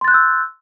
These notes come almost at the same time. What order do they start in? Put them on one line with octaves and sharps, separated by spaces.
C6 A6 F#6 G6 E6